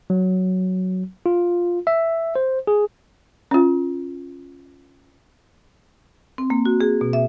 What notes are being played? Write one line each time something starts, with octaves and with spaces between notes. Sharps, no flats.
F#3
F4
E5
C5
G#4
C#4 F4
C4
A#3
F#4
G#4
B2
E5